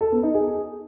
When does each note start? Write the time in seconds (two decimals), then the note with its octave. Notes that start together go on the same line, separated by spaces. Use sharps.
0.01 A4
0.12 B3
0.23 D#4
0.34 G#4